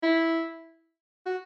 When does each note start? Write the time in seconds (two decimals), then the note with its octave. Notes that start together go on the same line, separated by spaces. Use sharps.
0.03 E4
1.26 F#4